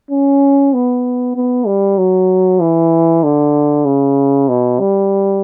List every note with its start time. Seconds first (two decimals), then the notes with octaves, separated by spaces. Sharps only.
0.11 C#4
0.74 B3
1.36 B3
1.66 G3
1.98 F#3
2.61 E3
3.24 D3
3.85 C#3
4.49 B2
4.79 G3